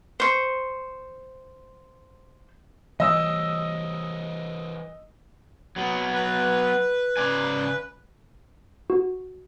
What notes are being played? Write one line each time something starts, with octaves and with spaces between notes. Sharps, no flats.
C5 C#6
E3 G3 D#5 E6
F#3 B3
B4
C#3 D5 G#5
F#4